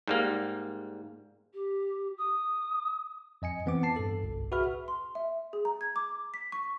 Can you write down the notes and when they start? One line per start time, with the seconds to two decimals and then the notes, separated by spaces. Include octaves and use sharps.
0.08 G#2 G3 A#3
1.54 G4
2.18 D#6
3.42 F2 D#5 G#5 C#7
3.66 E3 B3 C4 D6
3.83 A5 C7
3.96 G2 A4
4.23 G1 C2
4.52 F#4 G#4 B4 E5 B5 F6
4.88 C6
5.15 E5
5.53 G#4
5.65 A#5
5.81 G#6
5.96 D6
6.34 B6
6.52 C#6